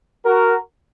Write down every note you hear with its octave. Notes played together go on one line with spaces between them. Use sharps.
F#4 A#4